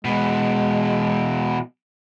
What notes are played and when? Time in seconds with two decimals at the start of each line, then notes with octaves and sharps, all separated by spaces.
0.05 B2 E3 G#3